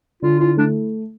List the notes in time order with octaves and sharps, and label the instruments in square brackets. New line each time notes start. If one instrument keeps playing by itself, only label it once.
[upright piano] D3 [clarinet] F4
[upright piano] E4 [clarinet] F4
[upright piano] A3 [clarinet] D4